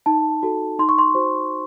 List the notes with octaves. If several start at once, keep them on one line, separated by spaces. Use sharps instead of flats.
D#4 A5
F#4 A4
D#4 C6
C#6
C6
F#4 C5